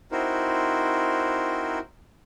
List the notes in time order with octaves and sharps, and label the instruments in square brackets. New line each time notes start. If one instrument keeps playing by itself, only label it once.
[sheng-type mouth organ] C4 D#4 E4 F#4 A#4 C5